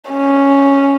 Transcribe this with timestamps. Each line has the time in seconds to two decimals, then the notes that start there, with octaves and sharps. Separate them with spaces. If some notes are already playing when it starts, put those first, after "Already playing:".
0.10 C#4